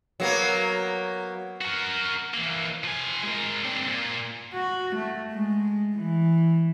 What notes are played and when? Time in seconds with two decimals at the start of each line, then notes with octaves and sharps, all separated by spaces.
0.20 F#3 A#3 B3
1.61 F#4 A#4
2.34 E3 A#3
2.84 F3 G#5
3.23 G#3 A#4
3.64 C4 D4
3.87 A#2
4.54 F#4
4.96 A3
5.32 G#3
5.95 E3